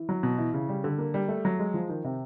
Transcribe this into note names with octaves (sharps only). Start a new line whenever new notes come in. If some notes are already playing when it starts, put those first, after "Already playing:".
Already playing: E3
F#3
B2
E3
C#3
G3
D3
A#3
G3
A3
F#3
G#3
F3
D#3
C3